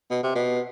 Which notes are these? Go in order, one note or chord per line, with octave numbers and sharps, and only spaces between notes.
B2
C3
B2